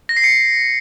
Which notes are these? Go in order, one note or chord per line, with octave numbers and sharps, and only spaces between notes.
A#6
C7
C#7